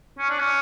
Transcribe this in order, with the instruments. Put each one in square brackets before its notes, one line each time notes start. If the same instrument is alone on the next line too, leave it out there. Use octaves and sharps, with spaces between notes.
[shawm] C#4
D4
C#4